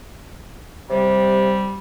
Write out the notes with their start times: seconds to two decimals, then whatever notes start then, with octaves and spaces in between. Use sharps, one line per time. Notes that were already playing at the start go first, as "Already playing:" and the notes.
0.90 C3 G3